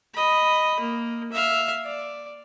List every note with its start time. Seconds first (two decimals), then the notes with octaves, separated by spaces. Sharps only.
0.14 D#5 B5
0.80 A#3
1.32 E5 F5
1.85 D5